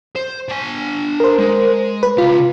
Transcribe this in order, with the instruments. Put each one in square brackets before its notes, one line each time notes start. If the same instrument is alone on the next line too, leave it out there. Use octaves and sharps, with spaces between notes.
[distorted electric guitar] C5
D4 G#5
[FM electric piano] A#4 C5
[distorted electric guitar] G#3
[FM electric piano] B4
[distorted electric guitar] C#3 G4 [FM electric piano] F4